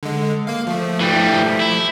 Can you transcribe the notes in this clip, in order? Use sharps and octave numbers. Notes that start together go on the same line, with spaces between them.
D3 G#3
A#3 F5
F3 A3
E3 G3
E4